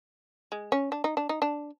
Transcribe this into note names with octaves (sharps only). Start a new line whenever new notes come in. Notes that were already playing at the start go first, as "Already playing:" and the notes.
G#3
C#4
D4
D#4
D4
D#4
D4